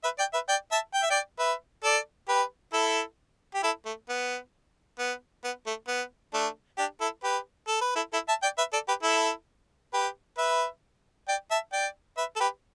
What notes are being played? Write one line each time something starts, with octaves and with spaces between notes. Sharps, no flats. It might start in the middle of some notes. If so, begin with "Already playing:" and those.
B4 E5
D5 G5
B4 E5
D5 G5
E5 A5
G5
E5
D5 G5
B4 E5
A4 D5
G4 B4
E4 A4
G4
E4 A4
A3
B3
B3
B3
A3
B3
A3 D4
D4 G4
E4 A4
G4 B4
A4
B4
E4 A4
E4 A4
E5 A5
D5 G5
B4 E5
A4 D5
G4 B4
E4 A4
G4 B4
B4 E5
D5 G5
E5 A5
D5 G5
B4 E5
A4
G4 B4